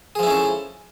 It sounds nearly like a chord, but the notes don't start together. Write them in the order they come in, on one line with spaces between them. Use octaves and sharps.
G#4 F3 E4 C#4 A4